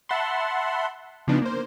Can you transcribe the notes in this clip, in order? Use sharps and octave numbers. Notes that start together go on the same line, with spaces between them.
E5 F#5 A5 B5 C6
C#3 F3 B3 D4 D#4
A#3 C5